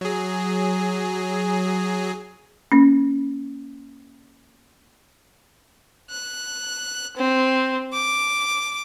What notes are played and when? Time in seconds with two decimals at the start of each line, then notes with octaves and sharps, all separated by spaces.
0.01 F#3 G#4
2.72 A#3 C#4
6.11 F#6
7.17 C4
7.93 D6